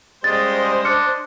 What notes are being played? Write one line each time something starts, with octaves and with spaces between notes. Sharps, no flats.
C#3 G3 G#3 C5 D#5 A6
D4 D6 F6 C#7